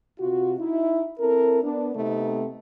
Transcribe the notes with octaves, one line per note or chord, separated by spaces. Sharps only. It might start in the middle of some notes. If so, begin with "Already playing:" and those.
C3 F4 F#4
D#4 E4
C4 E4 A4 A#4
B3 D4
C3 A3 B3 C4 D#4